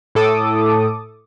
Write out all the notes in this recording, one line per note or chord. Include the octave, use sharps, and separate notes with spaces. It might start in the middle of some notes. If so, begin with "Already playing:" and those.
A2 A4 D6 D#6